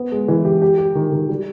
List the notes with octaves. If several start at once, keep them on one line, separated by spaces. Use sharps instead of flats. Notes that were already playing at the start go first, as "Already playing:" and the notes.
Already playing: B3
G#3
E3
G4
G4
G4
D#3
D#3
G3